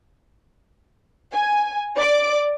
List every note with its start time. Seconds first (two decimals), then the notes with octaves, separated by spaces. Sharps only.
1.35 G#5
1.95 D5 D6